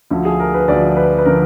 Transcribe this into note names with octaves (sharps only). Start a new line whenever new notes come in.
D2 D3 F3
G#4
A#4
B4
D2 D3 F3 D5
B4
B4
D3 F3 A#4